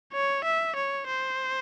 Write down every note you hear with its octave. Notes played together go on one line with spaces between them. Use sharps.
C#5
E5
C#5
C5